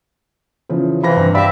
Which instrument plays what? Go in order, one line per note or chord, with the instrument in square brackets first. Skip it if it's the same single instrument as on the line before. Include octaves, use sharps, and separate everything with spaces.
[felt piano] C#3 E3 F3
[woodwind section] C3 E3 [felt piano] F5 B5 A#6
[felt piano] G2
[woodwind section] G4 D5 E5 [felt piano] F5 B5